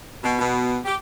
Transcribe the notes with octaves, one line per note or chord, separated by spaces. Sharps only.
B2
B2
G4